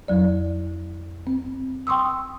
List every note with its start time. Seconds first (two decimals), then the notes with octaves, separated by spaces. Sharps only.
0.08 F2 F#3 D5
1.27 C4
1.87 G5 C6 C#6 D#6 E6